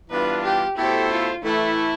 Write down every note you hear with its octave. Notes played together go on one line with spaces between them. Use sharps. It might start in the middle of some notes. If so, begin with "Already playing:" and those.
G2 E3 B3 D4 F4 B4
G4
B2 A3 E4 G4 A4 C5
F4
A2 E3 A3 E4